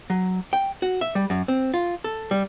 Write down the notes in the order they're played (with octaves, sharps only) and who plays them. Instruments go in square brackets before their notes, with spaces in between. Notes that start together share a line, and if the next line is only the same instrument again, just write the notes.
[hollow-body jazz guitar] F#3
G5
F#4
E5
G3
F#2
C4
F4
A4
G3